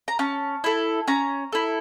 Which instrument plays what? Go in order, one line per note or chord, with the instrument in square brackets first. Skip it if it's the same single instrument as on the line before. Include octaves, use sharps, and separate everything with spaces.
[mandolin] A#5
C#4 A5
E4 A4
C#4 A#5
E4 A4